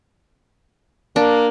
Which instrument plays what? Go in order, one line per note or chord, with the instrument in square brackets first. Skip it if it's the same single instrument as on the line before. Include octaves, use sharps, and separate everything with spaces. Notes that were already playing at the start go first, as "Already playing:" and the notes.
[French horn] A#3 [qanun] D4